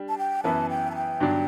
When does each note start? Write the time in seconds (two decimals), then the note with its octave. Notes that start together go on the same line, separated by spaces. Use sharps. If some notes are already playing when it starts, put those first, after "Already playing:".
Already playing: G3 D4 G4
0.09 A5
0.18 G5
0.44 F#2 E3 B3 E4 B4 A5
0.70 G5
0.91 A5
0.95 G5
1.20 G2 D3 F#3 B3 D4